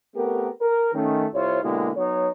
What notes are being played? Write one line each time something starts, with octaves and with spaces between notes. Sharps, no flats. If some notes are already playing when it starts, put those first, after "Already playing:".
A3 B3 C4 G4 A#4
A#4
D#3 A3 C#4
C2 E4 F4 C5 C#5
B2 D3 G#3 A#3 E4 G4
F#3 B3 D#4 C#5